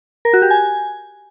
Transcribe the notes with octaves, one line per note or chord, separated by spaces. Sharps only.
A#4
F#4
G4
G#5